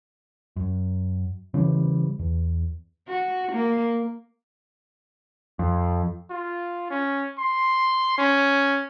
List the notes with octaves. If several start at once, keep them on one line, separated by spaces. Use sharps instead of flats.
F#2
C#3 E3 G3
E2
F#4
A#3
F2
F4
C#4
C6
C#4